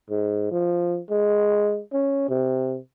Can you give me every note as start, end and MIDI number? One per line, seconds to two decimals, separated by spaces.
0.10 0.49 44
0.51 0.99 53
1.10 1.81 56
1.93 2.29 61
2.29 2.77 48